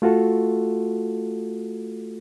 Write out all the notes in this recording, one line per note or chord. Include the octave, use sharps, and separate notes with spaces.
A3 F4 F#4 A4